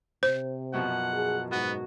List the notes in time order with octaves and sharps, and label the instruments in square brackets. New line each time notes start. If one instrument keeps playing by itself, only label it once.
[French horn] C3 [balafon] C5
[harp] F#2 B2 F3 [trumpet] F#5
[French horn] G#4
[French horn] G#2 [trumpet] B3 [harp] F#4